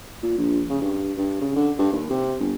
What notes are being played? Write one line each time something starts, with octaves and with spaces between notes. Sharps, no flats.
A#2
A#1
C#3
G2
G2
C#3
D3
G2
D#2
C3
G1